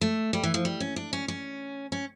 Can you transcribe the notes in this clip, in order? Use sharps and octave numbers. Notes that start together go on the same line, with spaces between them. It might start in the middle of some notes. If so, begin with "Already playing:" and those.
A3
G3
E3
F3
G3
C#4
D4
C#4
C#4
C#4